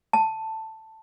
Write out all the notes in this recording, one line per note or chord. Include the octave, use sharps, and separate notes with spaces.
A5